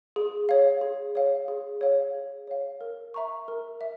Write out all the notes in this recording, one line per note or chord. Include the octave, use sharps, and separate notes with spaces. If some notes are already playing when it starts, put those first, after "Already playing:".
G#4
C#5 F5
G#4
C#5 F5
G#4
C#5 F5
G#4
C#5 F5
A#4
E5 A#5 C#6
A#4
E5